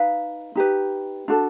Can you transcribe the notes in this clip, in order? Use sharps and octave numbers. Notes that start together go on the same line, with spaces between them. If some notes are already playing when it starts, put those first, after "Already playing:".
Already playing: D#4 B4 F5
D#4 G4 B4
D4 F#4 A4